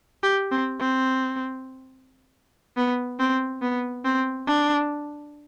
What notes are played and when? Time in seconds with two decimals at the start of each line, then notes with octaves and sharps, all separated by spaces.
0.23 G4
0.52 C4
0.80 C4
2.77 B3
3.20 C4
3.62 B3
4.05 C4
4.47 D4